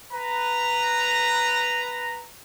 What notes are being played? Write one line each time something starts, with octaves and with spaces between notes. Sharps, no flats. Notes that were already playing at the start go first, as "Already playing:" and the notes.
B4 A#5